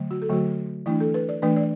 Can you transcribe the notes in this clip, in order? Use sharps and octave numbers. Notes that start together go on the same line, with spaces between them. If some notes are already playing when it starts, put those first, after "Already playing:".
Already playing: D3 F#3 A3
F#4
A4
D3 F#3 A3 F#4
E3 A3 D4 E4
A4
B4
D5
E3 A3 D4 B4
D5